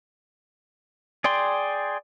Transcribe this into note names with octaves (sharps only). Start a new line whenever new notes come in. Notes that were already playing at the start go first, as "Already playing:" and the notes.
G#4 D5 G5 C6